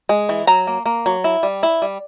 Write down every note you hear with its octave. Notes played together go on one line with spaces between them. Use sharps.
G#3
E3
F#3 A#5
A#3
A#3
F#3
E4
G3
E4
G3